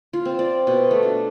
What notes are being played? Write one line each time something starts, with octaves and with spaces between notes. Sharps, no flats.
F4
C4
D5
B2
A3
D4